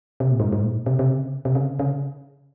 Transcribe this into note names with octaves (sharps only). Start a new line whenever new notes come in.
C3
A#2
G#2
G#2
A#2
C3
C3
C#3
C3
C#3
C#3